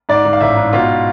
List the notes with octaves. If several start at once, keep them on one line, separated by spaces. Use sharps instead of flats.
G#2 D5
G#2
F5
A1 E5
G#2
B2 F4